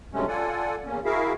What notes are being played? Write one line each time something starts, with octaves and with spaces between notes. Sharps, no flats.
G2 C3 F#3 G#3 A3 C#4
F4 A4 D5 F#5 G#5
E2 A#3 C#4
E4 F#4 G#4 A#4 E5 F5